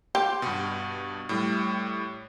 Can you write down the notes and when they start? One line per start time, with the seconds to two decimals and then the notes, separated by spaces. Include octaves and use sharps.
0.15 G4 C6
0.42 G2 B2
1.29 A2 G3